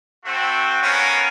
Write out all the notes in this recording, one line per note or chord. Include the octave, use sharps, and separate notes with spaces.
A3 C4 F#4
B3 C#4 A#4 F5